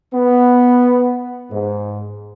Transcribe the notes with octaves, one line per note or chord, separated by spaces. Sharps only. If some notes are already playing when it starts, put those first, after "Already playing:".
B3
G#2